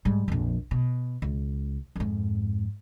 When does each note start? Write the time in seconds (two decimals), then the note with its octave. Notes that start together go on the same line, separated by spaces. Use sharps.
0.05 G#2 G3
0.28 A#1 F2
0.71 B2
1.22 C#2
1.96 F2 G#2